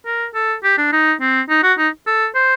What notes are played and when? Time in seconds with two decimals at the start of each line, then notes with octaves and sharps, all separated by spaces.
0.06 A#4
0.35 A4
0.64 G4
0.78 D4
0.93 D#4
1.21 C4
1.50 D#4
1.63 F#4
1.78 D#4
2.07 A4
2.35 C5